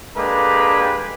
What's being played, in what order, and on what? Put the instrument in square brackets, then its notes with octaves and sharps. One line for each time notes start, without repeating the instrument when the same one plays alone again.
[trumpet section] G#3 A#3 D4 G4 A4 B4